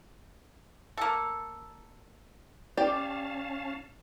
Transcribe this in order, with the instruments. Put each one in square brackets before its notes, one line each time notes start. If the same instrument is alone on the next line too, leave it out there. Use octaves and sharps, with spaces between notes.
[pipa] A#3 A4
[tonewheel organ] C#4 F5 A5 [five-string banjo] G4 D5